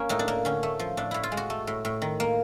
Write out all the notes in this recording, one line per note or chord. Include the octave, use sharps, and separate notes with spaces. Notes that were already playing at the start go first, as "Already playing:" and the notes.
Already playing: A#3 C#4
A2 D#4
D4
A#3
D3 C#4
A3
F3
A2 D4
A2 E4
F4
G#3
F#4
A3
A2
A2
D#3
A#3